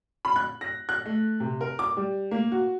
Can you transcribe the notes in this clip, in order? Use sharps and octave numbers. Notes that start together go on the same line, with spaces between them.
B5
F#6
A#6
F#6
A3
C3
A#4
D6
G3
A#3
F#4